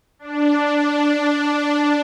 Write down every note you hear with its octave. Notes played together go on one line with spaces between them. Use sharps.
D4
D4